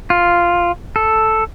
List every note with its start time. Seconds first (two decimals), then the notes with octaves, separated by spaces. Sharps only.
0.10 F4
0.96 A4